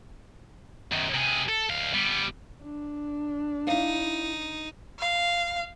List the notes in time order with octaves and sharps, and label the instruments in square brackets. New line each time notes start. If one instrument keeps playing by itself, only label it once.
[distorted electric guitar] F#2 D#3
C3 G#4
A4
D2 F5
G3 B3
[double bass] D4
[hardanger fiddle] D#4 [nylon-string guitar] E4 F5
[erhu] F5